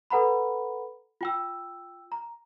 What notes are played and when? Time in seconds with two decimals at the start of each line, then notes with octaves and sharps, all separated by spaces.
0.10 A4 B4 F#5 A#5 B5
1.21 F4 G5 E6
2.12 A#5